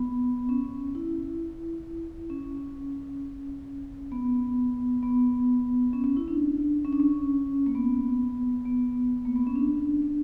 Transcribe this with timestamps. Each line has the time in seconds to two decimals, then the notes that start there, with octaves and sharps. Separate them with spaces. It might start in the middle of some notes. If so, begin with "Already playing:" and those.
Already playing: B3
0.49 C#4
0.95 E4
2.30 C#4
4.12 B3
5.03 B3
5.93 C#4
6.04 C#4
6.17 E4
6.28 D4
6.85 C#4
6.93 D4
7.00 C#4
7.66 A#3
7.75 B3
8.65 B3
9.25 A#3
9.36 B3
9.47 C#4
9.56 D4
10.02 D4